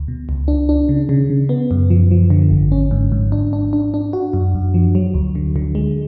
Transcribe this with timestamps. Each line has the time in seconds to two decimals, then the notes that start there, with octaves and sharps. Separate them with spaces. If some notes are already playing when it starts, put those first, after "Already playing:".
Already playing: D2
0.08 B2
0.29 C#2
0.48 D4
0.69 D4
0.89 C#3
1.09 C#3
1.30 C#3
1.49 B3
1.71 F#2
1.90 F3
2.11 F3
2.30 D3
2.51 G#1
2.72 C#4
2.91 G#2
3.12 G#2
3.32 D4
3.53 D4
3.73 D4
3.94 D4
4.13 F#4
4.33 F#2
4.55 F#2
4.74 F3
4.95 F#3
5.14 D2
5.35 D3
5.56 D3
5.75 G#3